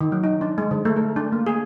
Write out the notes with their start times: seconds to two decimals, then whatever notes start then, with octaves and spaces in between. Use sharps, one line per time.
0.01 D#3
0.12 F#3
0.24 D#4
0.41 D4
0.58 G#3
0.71 D3
0.85 A3
0.96 A#4
1.16 D4
1.32 A#3
1.46 G#4